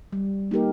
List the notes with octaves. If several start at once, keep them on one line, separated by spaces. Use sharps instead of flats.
G3
A#3 D#4 G4 A#4